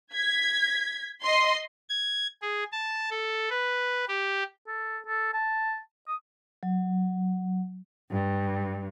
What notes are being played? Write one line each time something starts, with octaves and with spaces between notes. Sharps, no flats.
G#6 B6
D#5 C6
G#6
G#4
A5
A4
B4
G4
A4
A4
A5
D#6
F#3
G2